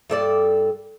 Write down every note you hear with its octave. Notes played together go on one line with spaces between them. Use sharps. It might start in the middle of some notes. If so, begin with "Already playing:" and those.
G2 A4 D5